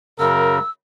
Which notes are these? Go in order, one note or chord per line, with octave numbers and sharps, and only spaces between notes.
F#2 C#3 A#4 E6